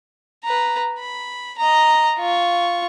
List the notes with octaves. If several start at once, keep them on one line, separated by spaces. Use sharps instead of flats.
B4 A#5
B5
D#5 A#5
F4 C#6